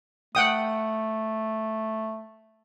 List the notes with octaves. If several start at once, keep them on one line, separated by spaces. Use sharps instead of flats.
A3 F#5 G5 D#6